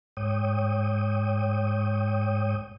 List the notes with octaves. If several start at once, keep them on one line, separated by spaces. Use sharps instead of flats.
G#2 C#5 G5 D#6